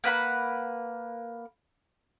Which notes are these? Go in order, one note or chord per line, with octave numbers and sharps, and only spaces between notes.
A#3 B4 F#5 B5